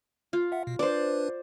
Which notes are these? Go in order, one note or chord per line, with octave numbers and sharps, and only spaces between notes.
F4
E5 F#5
B2
D4 B4 C5 D5